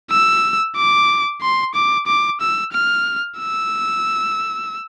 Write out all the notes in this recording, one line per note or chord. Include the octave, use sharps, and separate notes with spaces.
E6
D6
C6
D6
D6
E6
F6
E6